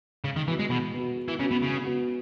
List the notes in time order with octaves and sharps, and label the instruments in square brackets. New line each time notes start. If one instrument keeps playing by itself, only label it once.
[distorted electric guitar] C#3 [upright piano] G#3
[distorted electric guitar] D#3
[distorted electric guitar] E3 [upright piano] B3 F#4
[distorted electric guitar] G#3
[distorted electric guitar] B2 [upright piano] G#3
[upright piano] B3 F#4
G#3
[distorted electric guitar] E3
[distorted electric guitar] C#3 [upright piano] B3
[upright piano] F#4
[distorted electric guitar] B2
[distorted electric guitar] C#3 [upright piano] G#3
[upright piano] B3 F#4